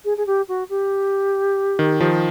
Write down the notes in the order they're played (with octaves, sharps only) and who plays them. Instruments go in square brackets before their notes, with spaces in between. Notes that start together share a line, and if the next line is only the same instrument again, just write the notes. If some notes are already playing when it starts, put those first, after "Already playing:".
[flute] G#4
G#4
G4
F#4
G4
[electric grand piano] D#3
D#3 F3